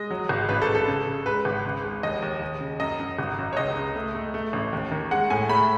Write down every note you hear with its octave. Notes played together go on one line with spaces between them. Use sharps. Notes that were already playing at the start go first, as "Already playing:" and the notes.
Already playing: G#3 D#5
F#3
G#1
A1 B4
A4
G#2
A4
C#3
C#3
G#3 B4
G#1
C#2
G#3
D#2 D#5
D#2
D#2
C#3
F#2 D#5
F#2
G#1
F#2
C#5
C#2 D#5
C#2
A3
A3
A3
A1
D#2
D#3
G#3 F#5
A2 G#5
A3 B5